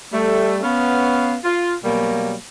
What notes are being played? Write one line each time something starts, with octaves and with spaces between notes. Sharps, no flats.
G3 A3
B3 C#4 F5
F4
B2 F#3 G3 A#3